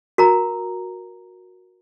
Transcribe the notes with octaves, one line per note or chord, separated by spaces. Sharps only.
F#4 A#4 A#5